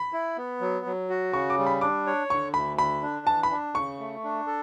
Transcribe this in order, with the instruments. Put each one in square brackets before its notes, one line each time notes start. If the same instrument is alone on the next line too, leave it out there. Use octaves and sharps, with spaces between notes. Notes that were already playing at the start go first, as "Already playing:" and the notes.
Already playing: [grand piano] B5
[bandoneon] E4
B3
F#3
F#3
F#4
[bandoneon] C#3 [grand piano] C#6
[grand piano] D6
[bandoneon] G3
[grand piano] B5
[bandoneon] D4 [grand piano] D6
[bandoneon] C#5
[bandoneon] D3 [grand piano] C#6
[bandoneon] D2 [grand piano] B5
[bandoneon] D3 [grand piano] B5
[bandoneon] D4
[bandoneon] E3 [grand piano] A5
[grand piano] B5
[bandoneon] D4
[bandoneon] C#3 [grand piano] C#6
[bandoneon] A3
D4
A4